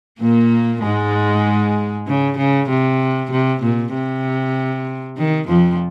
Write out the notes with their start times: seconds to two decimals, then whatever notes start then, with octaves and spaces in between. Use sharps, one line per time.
0.21 A#2 A#3
0.83 G#2 G#3
2.07 C#3
2.38 C#3
2.69 C3
3.31 C3
3.62 A#2
3.93 C3
5.17 D#3
5.47 F2 F3